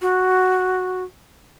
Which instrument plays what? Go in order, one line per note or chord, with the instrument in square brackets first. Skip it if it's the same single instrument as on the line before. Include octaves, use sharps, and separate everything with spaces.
[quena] F#4